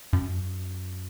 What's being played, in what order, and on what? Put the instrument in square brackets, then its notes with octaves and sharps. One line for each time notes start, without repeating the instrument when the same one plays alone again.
[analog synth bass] F#2